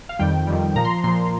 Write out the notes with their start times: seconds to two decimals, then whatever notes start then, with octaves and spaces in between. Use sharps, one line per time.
0.09 F5
0.19 F2 D#3 G3 G5
0.47 F2 D#3 G3
0.75 A#2 F3 A#5
0.85 C6
1.04 A#2 F3 C6